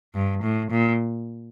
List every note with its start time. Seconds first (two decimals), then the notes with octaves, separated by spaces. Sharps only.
0.15 G2
0.43 A2
0.71 A#2